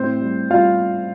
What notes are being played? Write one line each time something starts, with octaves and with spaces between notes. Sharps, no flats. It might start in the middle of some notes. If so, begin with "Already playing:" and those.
Already playing: A2 C4 C5
G3
G3 F4 F5